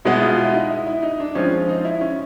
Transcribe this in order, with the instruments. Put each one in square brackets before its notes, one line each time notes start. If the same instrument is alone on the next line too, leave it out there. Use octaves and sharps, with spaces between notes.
[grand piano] B2 G#3 B3 [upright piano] E4
[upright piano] F4
E4
D#4
E4
E4
D#4
D4
[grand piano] F3 G#3 C4 F4 [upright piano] C#4
[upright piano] D#4
E4
C#4